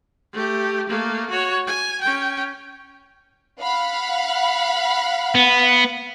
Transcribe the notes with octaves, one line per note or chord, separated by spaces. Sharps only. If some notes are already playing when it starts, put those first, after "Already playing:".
A3 G4
A3 A#3
F#4 C#5
G#5
C#4 G5
F5 F#5 B5
B3